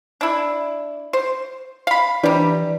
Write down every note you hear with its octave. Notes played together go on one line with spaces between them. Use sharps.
D4 E4
C5
F5 B5
C3 E3 G3 D4